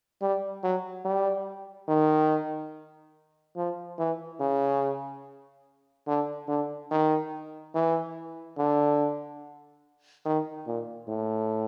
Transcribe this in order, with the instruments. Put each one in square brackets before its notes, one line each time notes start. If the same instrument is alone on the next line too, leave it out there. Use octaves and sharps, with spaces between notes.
[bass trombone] G3
F#3
G3
D#3
F3
E3
C#3
D3
D3
D#3
E3
D3
D#3
A#2
A2